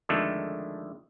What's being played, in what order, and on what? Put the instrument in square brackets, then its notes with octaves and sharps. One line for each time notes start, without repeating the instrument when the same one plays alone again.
[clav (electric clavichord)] F2 D3 D#3 G#3 A3